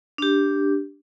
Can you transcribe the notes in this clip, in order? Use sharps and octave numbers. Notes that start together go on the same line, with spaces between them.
D4 G4